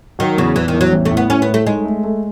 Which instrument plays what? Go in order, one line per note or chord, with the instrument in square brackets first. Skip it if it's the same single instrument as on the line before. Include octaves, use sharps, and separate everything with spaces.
[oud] D#3 [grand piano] F#3
[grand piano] E2 [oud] C#3
[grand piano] E2 [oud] E3
[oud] D#3
[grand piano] E2
[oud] F#3
[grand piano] A1
[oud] A3
[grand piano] A2
[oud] B3
[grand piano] A2 [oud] C#4
[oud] B3
[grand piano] A2
[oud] A3
[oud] G#3 [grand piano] D#4
[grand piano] A3
A3